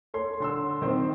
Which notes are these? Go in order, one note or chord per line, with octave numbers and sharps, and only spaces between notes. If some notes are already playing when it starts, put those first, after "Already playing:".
A3 C#5 C6
D3 C6 E6
D#3 C4 C5